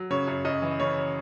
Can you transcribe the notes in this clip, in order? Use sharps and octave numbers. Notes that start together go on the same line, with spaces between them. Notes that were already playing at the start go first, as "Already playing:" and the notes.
Already playing: F#3
C#3 C#5
F#2
F#2 D#5
E3
C#3 C#5